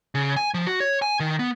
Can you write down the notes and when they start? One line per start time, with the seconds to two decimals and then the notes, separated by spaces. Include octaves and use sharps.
0.15 C#3
0.37 G#5
0.54 F3
0.67 F#4
0.80 C#5
1.02 G#5
1.20 D#3
1.39 B3